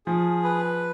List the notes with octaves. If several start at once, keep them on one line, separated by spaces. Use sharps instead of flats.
F3 G#4
B4